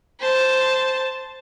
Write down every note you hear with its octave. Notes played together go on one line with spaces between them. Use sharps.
C5 A5